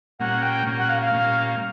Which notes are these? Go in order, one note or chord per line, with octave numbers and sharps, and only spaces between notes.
A#2 G3 A#3 C#4 F#5
G5
A#2 G3 A#3 C#4
F#5
F5
F5
A#2 G3 A#3 C#4